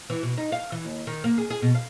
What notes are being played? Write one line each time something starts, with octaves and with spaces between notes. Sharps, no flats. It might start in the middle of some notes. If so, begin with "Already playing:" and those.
E3
B2
D#4
F5
E3
D#2
D#3
A#3
G#4
G#4
B2
F5